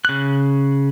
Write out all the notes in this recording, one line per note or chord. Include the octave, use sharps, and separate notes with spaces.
C#3 F#6